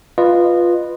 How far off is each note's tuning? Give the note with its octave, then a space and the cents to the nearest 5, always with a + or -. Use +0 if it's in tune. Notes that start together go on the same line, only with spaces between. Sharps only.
F4 +0 B4 +0 D#5 -20